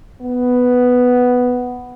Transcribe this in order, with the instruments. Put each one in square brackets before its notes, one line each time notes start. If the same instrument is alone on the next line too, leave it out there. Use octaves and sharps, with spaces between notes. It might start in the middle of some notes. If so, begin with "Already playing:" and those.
[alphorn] B3